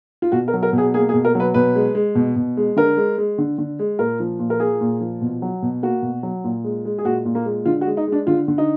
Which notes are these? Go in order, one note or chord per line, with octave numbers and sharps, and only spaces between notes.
F4
B2 F#4
A#4
F#3
A#4
B2
G#4
A#3 G#4
G#4
B2
A#4
F#3 B4
B2 B4
G#3
G#3
B2
B2
G#3
D3 A#4
G#3
G#3
D3
D3
G#3
A#2 A#4
F3
A#2
A#4
A#3 G#4
A#2
F3
B2
F#3
B2
A#3 F#4
B2
F#3
A#2
G#3
G#3
G#4
A#2 F#4
A#2
A#3
G#3
D3 F4
F#4
G#3
D#4
G#3 D4
D3 F4
D3
D#4